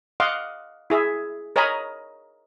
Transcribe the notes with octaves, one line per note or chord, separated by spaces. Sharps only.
D#5 F5 F#5 C6 D6
E4 G#4 E5
A#4 C#5 D#5 G#5 A#5 B5